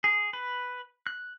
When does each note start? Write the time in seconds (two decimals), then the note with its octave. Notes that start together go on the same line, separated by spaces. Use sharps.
0.04 G#4
0.33 B4
1.07 F#6